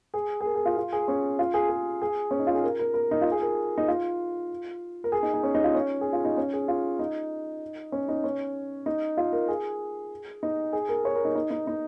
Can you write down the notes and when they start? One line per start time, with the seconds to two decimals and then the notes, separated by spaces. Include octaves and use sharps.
0.14 G#4
0.41 G#4
0.46 A#4
0.55 G#4
0.65 F4
0.77 F4
0.92 G#4
1.08 C#4
1.39 F4
1.54 G#4
1.69 G#4
2.02 G#4
2.31 C#4
2.39 D#4
2.47 F4
2.55 G#4
2.63 A#4
2.79 A#4
2.94 A#4
3.11 D#4
3.21 F4
3.32 G#4
3.42 A#4
3.78 D#4
3.88 F4
5.04 A#4
5.12 G#4
5.23 D#4
5.34 D#4
5.43 C#4
5.55 D#4
5.64 F4
5.75 C#4
6.01 G#4
6.13 F4
6.25 D#4
6.37 C#4
6.53 G#4
6.68 F4
6.99 D#4
7.92 C#4
8.09 D#4
8.24 C#4
8.86 D#4
9.17 F4
9.33 A#4
9.48 G#4
10.43 D#4
10.73 G#4
10.89 A#4
11.05 C#5
11.15 A#4
11.25 D#4
11.35 D#4
11.51 D#4
11.67 D#4